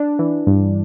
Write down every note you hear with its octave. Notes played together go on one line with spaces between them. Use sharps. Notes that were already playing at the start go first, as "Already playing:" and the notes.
Already playing: D4
E3
G2